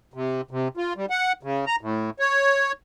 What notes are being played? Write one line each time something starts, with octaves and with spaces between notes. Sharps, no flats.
C3
C3
F4
G3
F#5
C#3
A#5
A2
C#5